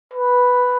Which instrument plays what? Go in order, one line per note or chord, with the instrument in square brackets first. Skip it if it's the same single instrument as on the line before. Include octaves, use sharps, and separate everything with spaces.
[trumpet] B4